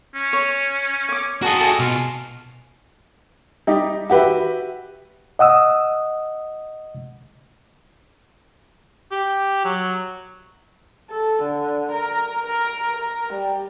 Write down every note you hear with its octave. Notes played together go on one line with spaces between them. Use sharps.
C#4
C#5
C#5 D6
F#4 G#4 D#5 A5 A#5
A4 D#5 G#5 A5
B2 F4
G3 D#4 G4
F#4 G4 B4 E5
D#5 F#5 D#6 E6
G4
F#3
A4
D3
A#4
A#4
A#4
G3